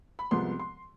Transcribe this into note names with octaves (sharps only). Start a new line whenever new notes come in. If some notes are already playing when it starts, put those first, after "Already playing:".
B5
C2 C3 F3 G#3 B3 C6
C6